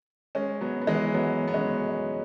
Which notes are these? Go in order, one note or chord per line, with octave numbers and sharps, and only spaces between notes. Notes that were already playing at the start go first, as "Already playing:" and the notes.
G#3 C#4
F#3 B3
B3
E3 G#3
F#3 B3
B3
G#3 C#4